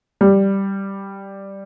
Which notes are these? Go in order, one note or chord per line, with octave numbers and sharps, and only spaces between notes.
G3